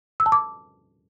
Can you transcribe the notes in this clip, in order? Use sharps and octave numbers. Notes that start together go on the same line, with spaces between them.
E6
A5
D6